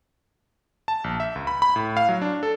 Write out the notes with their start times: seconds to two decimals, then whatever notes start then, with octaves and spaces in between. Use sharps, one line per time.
0.88 A5
1.04 A#1
1.20 E5
1.35 C#2
1.47 B5
1.62 B5
1.76 A2
1.97 F5
2.09 F#3
2.22 D4
2.43 A4